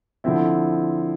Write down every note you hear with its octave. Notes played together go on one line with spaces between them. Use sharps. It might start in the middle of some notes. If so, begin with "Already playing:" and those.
D3 F3 C4 E4